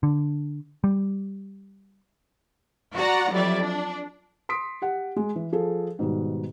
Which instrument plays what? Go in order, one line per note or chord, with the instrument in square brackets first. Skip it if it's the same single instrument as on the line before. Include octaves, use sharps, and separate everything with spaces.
[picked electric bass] D3
G3
[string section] F#4 D5 F#5 A#5
F2 F#3 G3 D5 E5
D4
[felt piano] C6 D#6 B6 D7
G4 F#5
G#3
E3
F3 G#4 A4
G#2 B2 D#3 G3